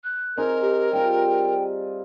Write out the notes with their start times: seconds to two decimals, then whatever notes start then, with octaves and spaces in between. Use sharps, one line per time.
0.04 F#6
0.37 C4 D#4 G#4 A#4
0.62 G4
0.93 G3 F4 G5